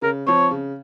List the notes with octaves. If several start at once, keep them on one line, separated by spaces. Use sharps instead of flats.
C#3 A#4
F3 C4 C#5
C#3